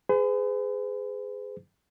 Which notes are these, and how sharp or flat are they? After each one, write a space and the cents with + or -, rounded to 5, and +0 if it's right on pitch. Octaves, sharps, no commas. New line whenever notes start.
G#4 +0 B4 +45